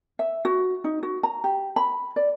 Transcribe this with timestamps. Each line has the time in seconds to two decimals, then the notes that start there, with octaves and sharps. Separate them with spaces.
0.19 E5
0.45 F#4
0.84 D#4
1.03 F#4
1.23 A#5
1.44 G4
1.76 B5
2.16 D5